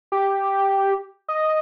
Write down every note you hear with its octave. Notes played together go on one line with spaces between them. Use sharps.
G4
D#5